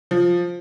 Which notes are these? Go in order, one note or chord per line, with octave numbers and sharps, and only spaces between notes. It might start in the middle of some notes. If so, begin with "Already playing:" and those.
F3